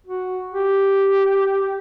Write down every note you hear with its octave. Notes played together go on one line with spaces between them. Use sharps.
F#4
G4